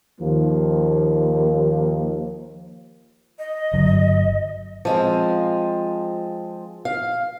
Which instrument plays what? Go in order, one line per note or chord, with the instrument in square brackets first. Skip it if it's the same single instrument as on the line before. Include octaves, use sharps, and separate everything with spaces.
[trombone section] D#2 D#3 F3 A#3
[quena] D#5
[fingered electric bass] G1 D3 F#3
[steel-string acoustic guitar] F3 G#3 C4
F5